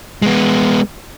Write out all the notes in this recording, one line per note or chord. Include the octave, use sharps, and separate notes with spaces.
G#3 B3